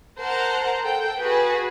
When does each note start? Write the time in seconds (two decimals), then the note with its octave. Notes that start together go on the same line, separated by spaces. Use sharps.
0.19 A#4 C5 F#5 A5 A#5
0.84 A4 G5
1.21 F#4 G#4 B4